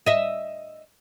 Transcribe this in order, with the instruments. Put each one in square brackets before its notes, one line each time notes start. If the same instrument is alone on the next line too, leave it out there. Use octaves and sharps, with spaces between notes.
[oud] D#5 E5